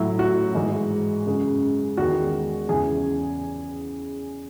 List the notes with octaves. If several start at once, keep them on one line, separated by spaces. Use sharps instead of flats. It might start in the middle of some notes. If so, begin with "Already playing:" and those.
Already playing: A2 F#3 E4
F#4
G#2 E3 G#3
F#2 C#3 G#3
E2 D#3 G#3 F#4
E2 C#3 E3 G#4